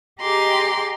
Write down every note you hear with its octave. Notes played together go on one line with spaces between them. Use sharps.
G4 G#4 D#5 A#5 C6 D6